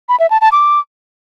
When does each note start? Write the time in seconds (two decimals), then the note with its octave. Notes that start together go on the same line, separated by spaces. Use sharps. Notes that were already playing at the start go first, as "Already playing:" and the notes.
0.09 B5
0.20 E5
0.31 A5
0.41 A5
0.52 D6